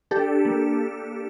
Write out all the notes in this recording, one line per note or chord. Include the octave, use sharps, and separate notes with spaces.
D4 G4 A4
A#3